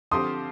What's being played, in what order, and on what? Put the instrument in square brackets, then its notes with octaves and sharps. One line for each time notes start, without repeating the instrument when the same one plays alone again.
[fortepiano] D3 F3 C4 G4 C5 [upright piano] C6 D#6